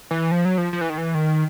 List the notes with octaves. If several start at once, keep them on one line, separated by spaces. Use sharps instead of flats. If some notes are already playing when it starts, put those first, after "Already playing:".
E3
F3
F#3
F3
F3
E3
D#3
E3
D#3